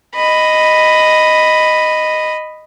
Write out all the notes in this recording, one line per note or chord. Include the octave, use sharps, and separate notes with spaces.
D#5 B5